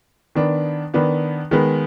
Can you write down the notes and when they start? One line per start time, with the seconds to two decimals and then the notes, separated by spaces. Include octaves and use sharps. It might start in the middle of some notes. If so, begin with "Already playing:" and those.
0.35 D#3 B3 D4
0.94 D#3 B3 D4
1.51 D#3 G#3 B3